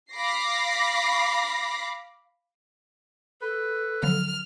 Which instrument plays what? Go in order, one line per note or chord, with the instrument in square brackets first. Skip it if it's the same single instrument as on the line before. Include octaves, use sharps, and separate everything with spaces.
[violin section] F5 B5 D6 A#6 C7
[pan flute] A4 [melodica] B4
[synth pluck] D3 F3 F#3 [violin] F6